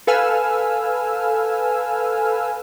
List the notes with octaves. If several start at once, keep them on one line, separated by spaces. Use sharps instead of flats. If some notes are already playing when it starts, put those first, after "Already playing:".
A4 B4 F5 G#5 E6 F6